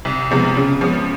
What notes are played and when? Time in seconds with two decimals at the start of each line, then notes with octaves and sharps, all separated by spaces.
0.05 C2
0.31 C3 F3 G#3 B3
0.57 C#3
0.81 F3 G#3 B3